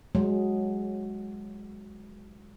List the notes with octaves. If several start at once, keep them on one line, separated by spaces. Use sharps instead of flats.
F#3 G#3